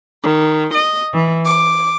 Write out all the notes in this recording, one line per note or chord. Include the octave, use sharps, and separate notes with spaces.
D#3
D#5
E3
D6